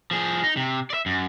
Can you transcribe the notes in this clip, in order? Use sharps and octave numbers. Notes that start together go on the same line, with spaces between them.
F3 G#4
D#4
C3
D5 E5
F#2